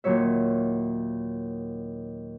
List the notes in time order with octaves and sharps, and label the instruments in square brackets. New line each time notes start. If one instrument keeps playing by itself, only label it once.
[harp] D#2 A#2 D#3 F#3 C#5 E5